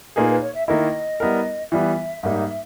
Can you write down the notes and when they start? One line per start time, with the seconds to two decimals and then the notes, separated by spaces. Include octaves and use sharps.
0.16 A#2 A#3 D#4 G#4 B4
0.29 B4
0.42 C#5
0.55 E5
0.68 D#3 A#3 E4 D#5
1.20 G3 B3 E4 A#4
1.72 E3 G3 B3 E5
2.23 G#2 G3 A#3 D#4